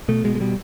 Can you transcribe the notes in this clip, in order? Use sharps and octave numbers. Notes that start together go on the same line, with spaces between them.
B2 A3
B2 G#3
G#3
B2 G3